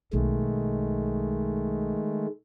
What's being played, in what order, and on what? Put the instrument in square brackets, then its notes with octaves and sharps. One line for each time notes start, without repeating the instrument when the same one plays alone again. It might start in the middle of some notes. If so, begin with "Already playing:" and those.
[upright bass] B1 [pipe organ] D#3 G#3 A3